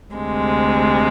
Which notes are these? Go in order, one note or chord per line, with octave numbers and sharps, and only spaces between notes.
D2 C3 G#3